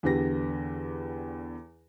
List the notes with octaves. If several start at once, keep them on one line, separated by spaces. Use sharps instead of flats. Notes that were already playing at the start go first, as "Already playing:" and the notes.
E2 D3 G4 B4 A#6